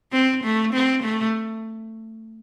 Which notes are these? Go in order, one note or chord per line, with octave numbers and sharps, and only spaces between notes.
C4
A3
C4
A3